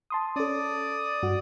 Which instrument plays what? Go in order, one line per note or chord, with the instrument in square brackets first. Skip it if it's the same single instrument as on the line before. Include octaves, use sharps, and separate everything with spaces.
[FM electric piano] A5 C6 D#6
[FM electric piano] C#4 A4 [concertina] D5 D#6
[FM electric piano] G2 F#4